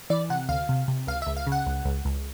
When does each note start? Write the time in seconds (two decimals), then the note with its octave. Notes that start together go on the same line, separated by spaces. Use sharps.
0.10 E3 D5
0.30 C3 F#5
0.49 D2 F5
0.69 C3
0.88 C3
1.07 C#2 F5
1.22 C#2 E5
1.37 F5
1.47 C#3
1.52 F#5
1.66 C#2
1.85 C#2
2.05 C#2